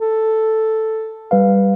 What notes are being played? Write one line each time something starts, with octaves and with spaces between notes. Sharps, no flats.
A4
G3 B4 F5